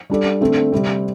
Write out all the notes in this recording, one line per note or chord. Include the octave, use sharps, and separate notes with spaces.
G3 D4 A4 D5
D3 A3 C4 A4
C3 G3 C4